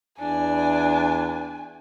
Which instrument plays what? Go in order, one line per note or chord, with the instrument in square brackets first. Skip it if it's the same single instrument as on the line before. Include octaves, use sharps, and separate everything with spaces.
[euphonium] E2 [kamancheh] D4 [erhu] G#5